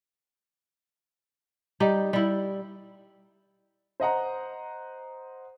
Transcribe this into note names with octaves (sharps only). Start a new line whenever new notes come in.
G3 D#4 G4
G3 E4
C5 D#5 F#5 A#5